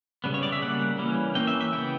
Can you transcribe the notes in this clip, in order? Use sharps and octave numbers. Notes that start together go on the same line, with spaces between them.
C#3 G3 B3
C#5
D5
E5
C#3 G3 A#3 F#5
E3 G3 A#3 C#4
E3 A#3 C#4 G5
E5
E5
C#3 E3 B3 G5